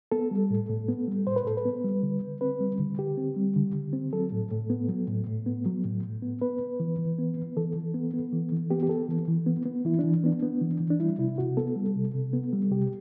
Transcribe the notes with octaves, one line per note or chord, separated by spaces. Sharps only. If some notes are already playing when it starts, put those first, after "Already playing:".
B3 A4
G3
A2
A2
B3
G3
A2 C5
B4
A2 A4
B4
B3
G3
D3
D3
C4 B4
G3
D3
D3 G4
C4
G3
D3
D3
C4
F#3 A4
A2
A2
B3
F#3
A2
A2
B3
F#3
A2
A2
B3
B3 B4
B3
E3
E3
B3
B3
E3 A4
E3
B3
B3
E3
E3
B3 G4
G4
B3 A4
E3
E3
B3
B3
E3 E4
E3 D4
B3 D4
B3
E3
E3
D4
G3 E4
C3 E4
C3 F#4
B3 A4
G3
C3
C3
B3
G3
C3 G4